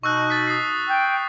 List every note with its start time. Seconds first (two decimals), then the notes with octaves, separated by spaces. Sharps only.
0.03 B2 D#4 C#6 E6 F#6
0.30 A6 B6
0.47 D#6 C7
0.89 G5